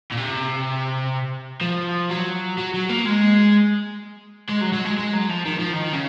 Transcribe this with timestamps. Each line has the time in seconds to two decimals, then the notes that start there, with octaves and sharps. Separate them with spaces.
0.12 A#2
0.17 C3
1.61 F3
2.10 F#3
2.58 F#3
2.74 F#3
2.89 A#3
3.06 G#3
4.50 G#3
4.62 F#3
4.73 F#3
4.85 G#3
4.97 G#3
5.13 F#3
5.29 F3
5.45 D#3
5.59 F3
5.73 D#3
5.93 C#3